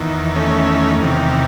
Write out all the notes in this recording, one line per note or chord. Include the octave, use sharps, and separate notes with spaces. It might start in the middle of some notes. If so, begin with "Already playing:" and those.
Already playing: E2 D#3
A3 C#4
E2 C3 D#3